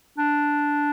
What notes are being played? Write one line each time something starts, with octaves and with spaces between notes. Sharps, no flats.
D4